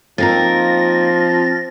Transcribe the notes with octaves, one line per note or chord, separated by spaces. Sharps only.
F3 A#3 C4 D#4 A#4 A6 A#6